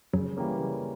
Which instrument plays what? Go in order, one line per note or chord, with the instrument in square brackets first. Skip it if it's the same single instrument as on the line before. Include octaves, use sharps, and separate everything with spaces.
[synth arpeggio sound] F#2 F#3 [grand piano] C#3
[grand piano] E3 G3 A#3 C#4
C#3